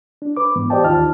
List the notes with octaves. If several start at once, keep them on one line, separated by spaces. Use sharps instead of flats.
D4
B4 D6
G#2 E3 B3
G4 C5 D5 D#5 G5 A5
D#2 D#3 D#4 F4 A5 F6